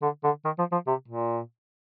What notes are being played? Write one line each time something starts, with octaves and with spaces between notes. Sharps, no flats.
D3
D3
D#3
F3
F3
C3
A#2